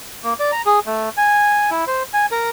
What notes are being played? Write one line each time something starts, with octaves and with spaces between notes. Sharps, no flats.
A#3
D5
A#5
G#4
A3
G#5
E4
C5
G#5
A#4